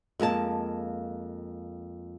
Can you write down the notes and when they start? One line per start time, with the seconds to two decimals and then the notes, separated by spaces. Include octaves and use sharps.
0.20 F2 G#3 A#3 A5